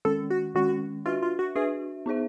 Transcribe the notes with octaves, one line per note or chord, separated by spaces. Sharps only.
D#3 G#3 C#4 A4
F#4
D#3 G#3 C#4 F#4
D4 F4 F#4 B4 E5
F4
F#4
D4 F#4 G#4 B4 E5
B3 D#4 G#4 C5 E5